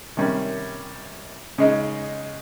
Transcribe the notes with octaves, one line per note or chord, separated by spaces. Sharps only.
C3 D#3 G3 C#4
C#3 G#3 D#4